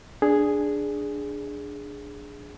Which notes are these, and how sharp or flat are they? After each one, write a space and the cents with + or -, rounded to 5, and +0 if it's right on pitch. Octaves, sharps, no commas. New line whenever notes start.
D4 +0 G#4 +0